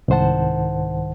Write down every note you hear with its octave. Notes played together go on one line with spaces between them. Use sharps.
C2 G#2 D#3 C5 F#5 A5